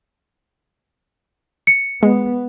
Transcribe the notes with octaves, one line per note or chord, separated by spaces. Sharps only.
C#7
G#3 B3